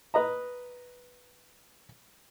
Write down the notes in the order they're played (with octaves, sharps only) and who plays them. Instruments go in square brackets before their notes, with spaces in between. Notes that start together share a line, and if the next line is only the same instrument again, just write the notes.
[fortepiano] B4 D#5 A#5